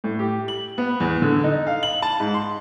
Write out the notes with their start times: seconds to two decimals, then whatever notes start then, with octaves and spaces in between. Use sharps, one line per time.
0.04 A2
0.19 G4
0.48 F#7
0.78 B3
1.00 E2
1.22 D3
1.44 D#4
1.67 F5
1.83 F#7
2.02 A5
2.20 G#2
2.34 C6